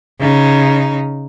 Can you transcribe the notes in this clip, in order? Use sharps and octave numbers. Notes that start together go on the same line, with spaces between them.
C#3 D#4